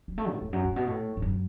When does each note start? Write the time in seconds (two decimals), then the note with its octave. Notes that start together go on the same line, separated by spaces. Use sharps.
0.08 F#3
0.18 A3
0.30 A2
0.41 E2
0.53 F#2
0.65 A2
0.76 B2
0.87 A2
1.17 A2
1.22 F#2